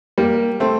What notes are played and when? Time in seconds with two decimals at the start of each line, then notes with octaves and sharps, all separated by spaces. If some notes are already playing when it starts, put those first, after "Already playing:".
0.18 G3 A#3
0.60 A3 C4